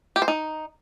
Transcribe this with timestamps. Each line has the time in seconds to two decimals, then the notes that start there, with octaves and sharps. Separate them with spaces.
0.16 G4
0.22 C5
0.28 D#4